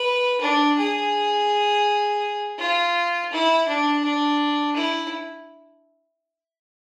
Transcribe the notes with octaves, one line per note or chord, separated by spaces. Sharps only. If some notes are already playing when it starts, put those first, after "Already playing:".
Already playing: B4
D4
G#4
F4
E4
D4
D4
E4